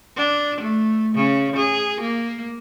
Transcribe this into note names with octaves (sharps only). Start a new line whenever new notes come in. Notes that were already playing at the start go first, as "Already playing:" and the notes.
D4
A3
C#3
G#4
A#3